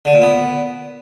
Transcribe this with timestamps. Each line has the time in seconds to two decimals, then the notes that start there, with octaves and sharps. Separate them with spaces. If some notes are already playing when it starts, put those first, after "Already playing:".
0.05 D3
0.13 A#2
0.22 B3